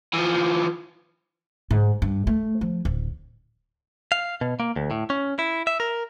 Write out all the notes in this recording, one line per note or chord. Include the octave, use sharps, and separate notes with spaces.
E3 F3
G#2
G2
A3
F3
D1
F5
B2
A#3
D2
A2
C#4
E4
E5
A#4